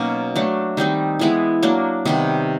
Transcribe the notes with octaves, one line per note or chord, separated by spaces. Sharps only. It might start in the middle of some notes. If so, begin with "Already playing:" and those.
Already playing: B2 F#3 A#3 C#4 D#4
F#3 A3 D4
D#3 G3 C4 D#4
E3 G#3 B3 E4
F#3 A#3 D4
C3 D#3 G3 B3